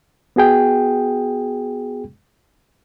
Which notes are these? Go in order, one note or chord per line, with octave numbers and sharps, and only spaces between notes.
B3 F#4 G#4 G5